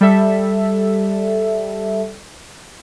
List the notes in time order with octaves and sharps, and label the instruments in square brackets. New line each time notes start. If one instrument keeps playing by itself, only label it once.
[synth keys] G3 A4 E5